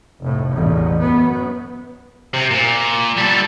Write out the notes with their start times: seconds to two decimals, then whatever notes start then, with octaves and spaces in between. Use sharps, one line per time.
0.22 F1 A2
0.51 A1 E2
1.01 F#2 B3
2.34 C3
2.51 A#2
3.17 G3 A4